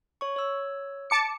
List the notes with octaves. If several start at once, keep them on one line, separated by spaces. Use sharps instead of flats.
C#5 C#6
C#5 E6
A5 D6 C#7